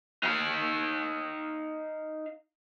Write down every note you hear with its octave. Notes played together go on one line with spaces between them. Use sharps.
D#4 F5